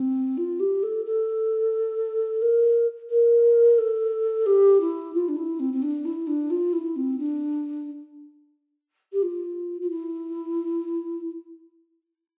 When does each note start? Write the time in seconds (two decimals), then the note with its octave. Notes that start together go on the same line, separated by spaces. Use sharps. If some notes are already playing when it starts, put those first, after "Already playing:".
Already playing: C4
0.37 F4
0.59 G4
0.83 A4
1.05 A4
2.41 A#4
3.09 A#4
3.78 A4
4.46 G4
4.80 E4
5.14 F4
5.28 D4
5.36 E4
5.59 C4
5.72 C4
5.82 D4
6.05 E4
6.27 D4
6.50 F4
6.72 E4
6.96 C4
7.18 D4
9.12 G4
9.22 F4
9.81 F4
9.90 E4